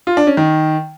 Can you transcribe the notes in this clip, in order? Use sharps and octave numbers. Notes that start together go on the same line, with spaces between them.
F4
D4
C#4
D#3